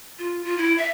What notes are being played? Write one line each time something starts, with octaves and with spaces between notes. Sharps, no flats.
F4
F4
E4
E5